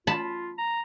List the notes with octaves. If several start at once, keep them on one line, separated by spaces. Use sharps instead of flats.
F4 A5 B5
A#5